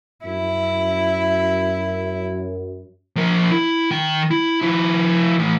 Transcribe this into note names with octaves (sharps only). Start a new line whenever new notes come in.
F#2 E4
F3 A#4
E4
D#3 G5
E4
F3 E4
A2 E3